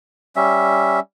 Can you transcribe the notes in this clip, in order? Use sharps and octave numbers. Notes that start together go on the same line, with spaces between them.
G3 C#4 E5